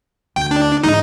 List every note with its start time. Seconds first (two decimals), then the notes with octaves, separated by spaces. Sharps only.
0.36 D2 G5
0.51 D4
0.83 E2 G#2 D#4